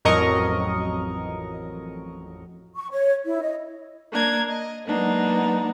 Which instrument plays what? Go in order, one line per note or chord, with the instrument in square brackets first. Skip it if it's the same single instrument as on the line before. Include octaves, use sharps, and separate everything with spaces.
[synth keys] A1 F2 F#3 A#4 D#5 C#6
[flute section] C#6
C#5
E4
D#5
[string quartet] A#3 D4 A#4 G#6
D#5
F#3 G#3 A#3 B3 D4 D#4